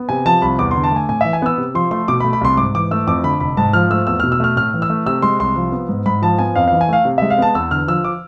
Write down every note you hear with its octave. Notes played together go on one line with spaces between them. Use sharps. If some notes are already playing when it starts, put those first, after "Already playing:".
Already playing: B3
C3 G#5
F3 A5
C2 B5
E2 D6
D3 C6
A5
A3 G#5
A2 G#5
E3 E5
G#5
B3 E6
C3
F3 C6
A3 C6
B2 D6
B5
A3
B5
C2 C6
G#2 D6
E3 D6
A3 E6
F2 D6
D3 B5
F1 B5
G#2 A5
F3 F6
A3 E6
E2 E6
B2 F6
E6
A3 F6
A2 F6
E3
E6
A3
C3 E6
G#3 C6
C2 C6
F3
B3
G#2
G#2 B5
F3 A5
B3 G#5
F2 F5
E3 F5
G#5
A3 F5
C3
G#3 E5
F5
B3 A5
E2 E6
D3 F6
F3 E6
D6